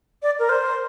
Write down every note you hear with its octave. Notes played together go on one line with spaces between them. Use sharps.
D5
A#4
C5